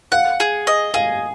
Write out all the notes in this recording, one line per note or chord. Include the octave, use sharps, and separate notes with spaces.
F5 F#5
G#4
D#5
G#4 F5